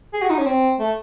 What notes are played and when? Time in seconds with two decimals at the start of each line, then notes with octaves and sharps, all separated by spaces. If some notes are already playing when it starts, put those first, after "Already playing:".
0.13 G#4
0.22 F#4
0.30 D#4
0.38 C#4
0.46 C4
0.79 A3